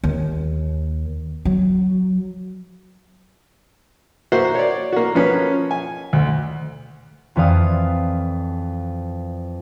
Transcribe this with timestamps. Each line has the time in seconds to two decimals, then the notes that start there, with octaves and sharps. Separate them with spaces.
0.04 D#2
1.45 F#3
4.32 A#3 F#4 C5 E5
4.55 C#5 D5
4.92 A#3 F#4
5.15 F3 A#3 C#4 B4 C#5
5.71 G#5
6.13 D2
7.36 F2 E3 D5 F5 D#6